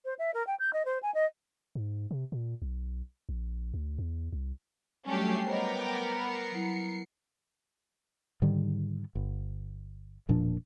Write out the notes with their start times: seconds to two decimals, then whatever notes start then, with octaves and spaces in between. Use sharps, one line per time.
0.05 C5
0.18 E5
0.34 A#4
0.47 G5
0.59 G6
0.73 D#5
0.85 C5
1.02 G#5
1.14 D#5
1.75 G#2
2.11 C3
2.32 A#2
2.62 B1
3.29 A#1
3.74 D2
3.98 E2
4.32 C2
5.06 F#3 G3 A3 C#4 D4 G4 C7
5.47 B3 A#4 C5 C#5 D#5 G5 D6
6.19 B5 C7 C#7
6.52 F#3 E4
8.42 G#2 D3 D#3 G3
9.15 G1
10.29 E1 A#2 F3 D4